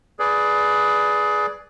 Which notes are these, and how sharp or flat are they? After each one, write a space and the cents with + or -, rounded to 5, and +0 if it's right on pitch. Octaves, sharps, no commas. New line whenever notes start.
G#4 +15 B4 +0 D5 +0